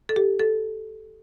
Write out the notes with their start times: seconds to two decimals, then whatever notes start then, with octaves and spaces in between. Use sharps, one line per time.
0.09 A4
0.16 G4
0.39 A4